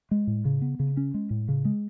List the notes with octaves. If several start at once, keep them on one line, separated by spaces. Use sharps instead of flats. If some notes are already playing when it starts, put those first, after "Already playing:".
G#3
A2
C#3
B3
C#3
C#4
G#3
A2
C#3
G#3